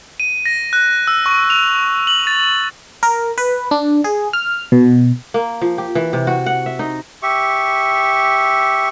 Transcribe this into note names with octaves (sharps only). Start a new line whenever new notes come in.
D#7
A#6
F#6
E6
C#6
F7
F#7
A6
A#4
B4
D4
G#4
F6
B2
A#3
F3
G4
E3
C3
F#4
F#5
E5
D#4
G4 E5 C#6